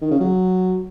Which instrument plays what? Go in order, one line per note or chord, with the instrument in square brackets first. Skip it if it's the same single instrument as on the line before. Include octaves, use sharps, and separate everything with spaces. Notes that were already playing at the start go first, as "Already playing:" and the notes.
[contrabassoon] D#3
C#3
F#3